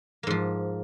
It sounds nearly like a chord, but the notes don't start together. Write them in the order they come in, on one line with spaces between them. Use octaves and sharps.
A#3 G#2 F3